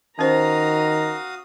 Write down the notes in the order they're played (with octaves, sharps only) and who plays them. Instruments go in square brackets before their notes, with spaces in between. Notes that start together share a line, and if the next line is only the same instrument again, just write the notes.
[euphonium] D#3 [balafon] C#4 C5 [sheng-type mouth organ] F#4 F5 D#6 [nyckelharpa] A#5